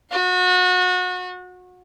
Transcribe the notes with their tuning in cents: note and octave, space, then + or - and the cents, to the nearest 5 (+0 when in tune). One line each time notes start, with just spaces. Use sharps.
F#4 -30 F#5 -30